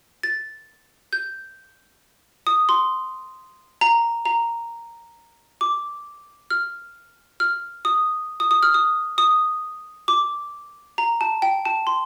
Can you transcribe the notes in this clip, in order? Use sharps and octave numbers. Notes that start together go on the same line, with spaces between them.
A6
G6
D#6
C6
A#5
A#5
D6
F6
F6
D#6
D#6
D#6
F6
D#6
D#6
D6
A#5
A5
G5
A5
C6